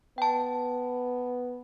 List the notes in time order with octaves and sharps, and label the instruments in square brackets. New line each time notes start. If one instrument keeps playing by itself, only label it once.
[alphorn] B3 [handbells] G5 A5